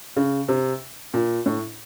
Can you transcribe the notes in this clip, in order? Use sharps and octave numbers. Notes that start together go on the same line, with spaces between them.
C#3
C3
A#2
A2